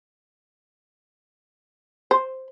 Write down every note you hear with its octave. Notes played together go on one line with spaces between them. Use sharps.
C5